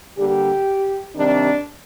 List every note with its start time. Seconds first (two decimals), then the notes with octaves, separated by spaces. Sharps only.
0.18 D3 G3 A#3 G4
1.15 C3 D#3 G3 C4 D4